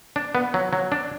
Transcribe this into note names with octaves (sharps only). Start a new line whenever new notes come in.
D4
B3
F#3
F#3
D4